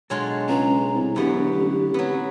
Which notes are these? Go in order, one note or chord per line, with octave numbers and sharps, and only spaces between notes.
B2 F#3 G#3 D4 F4 A4
C#2 A#5
C2
E1 F#2 D3 F#3 B3 G4
A1
F#3 B3 C4 B4